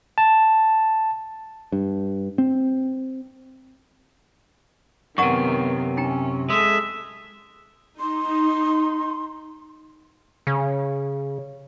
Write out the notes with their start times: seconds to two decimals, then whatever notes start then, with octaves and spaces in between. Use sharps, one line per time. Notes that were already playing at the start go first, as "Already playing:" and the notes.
0.18 A5
1.72 G2
2.38 C4
5.18 F#2 C3 D#3 B3 F#5 A#5 C#6
5.97 C#4 D#4 G5 A#5
6.50 G#3 A4 E5
8.00 D#4 C6
10.47 C#3